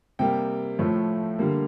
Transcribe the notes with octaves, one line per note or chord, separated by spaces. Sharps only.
C3 G3 A#3 G5
A2 F3 A3
D3 G3 A#3